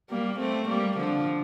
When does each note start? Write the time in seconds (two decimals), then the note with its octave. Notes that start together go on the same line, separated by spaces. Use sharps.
0.09 G3 A#3
0.39 A3 C4
0.68 G3 A#3
0.97 D3 F3